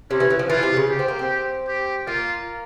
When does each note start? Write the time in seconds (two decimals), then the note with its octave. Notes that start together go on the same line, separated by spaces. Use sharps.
0.10 C3 C#4
0.20 E3
0.30 E3
0.39 F3
0.49 E3 F4
0.63 C3
0.76 C#3
0.90 G4
0.99 C4
1.08 A#3
1.19 C4
1.68 G4
2.07 A#3 F4